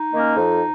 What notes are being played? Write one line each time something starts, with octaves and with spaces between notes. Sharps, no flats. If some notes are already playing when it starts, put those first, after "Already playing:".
Already playing: D#4
D#3 A#3 C#4
F2